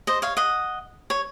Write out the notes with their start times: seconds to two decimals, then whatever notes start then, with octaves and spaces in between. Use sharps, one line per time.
0.07 C5 D#5
0.22 C#5 F5
0.37 D#5 F#5
1.10 C#5